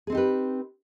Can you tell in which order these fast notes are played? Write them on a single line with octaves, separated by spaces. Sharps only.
G#4 C4 D#4 G4 B4